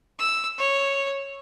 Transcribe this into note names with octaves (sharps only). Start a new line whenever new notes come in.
E6
C#5